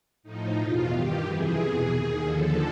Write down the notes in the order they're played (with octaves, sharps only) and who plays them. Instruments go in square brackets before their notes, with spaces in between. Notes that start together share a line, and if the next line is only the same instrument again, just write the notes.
[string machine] A2 F3 D#4
E2 B2 F4
G2 D#3 G4
F2 C3 E3 G#4
E2 B2
D#2 D#3
D#2 D3 F3 A4